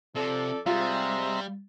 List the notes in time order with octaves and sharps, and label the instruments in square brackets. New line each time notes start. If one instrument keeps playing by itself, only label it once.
[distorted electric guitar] C3 [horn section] F3 A4 D5
[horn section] C3 G#3 [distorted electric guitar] G3 [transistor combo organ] C4 E5 A#5 [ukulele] F4